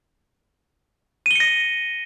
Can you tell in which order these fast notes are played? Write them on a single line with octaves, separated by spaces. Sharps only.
D#7 G7 C#7 A#6